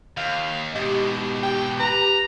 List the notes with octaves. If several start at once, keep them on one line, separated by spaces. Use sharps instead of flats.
D#2 F5
G#2 B2 G4 D#5
G5
B4 A#5